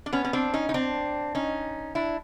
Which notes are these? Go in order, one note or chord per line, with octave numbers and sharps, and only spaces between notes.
D4
B3 C#4
C#4
C4 D4
C#4 D#4
D#4
C4 D4
C#4 D#4
D4 E4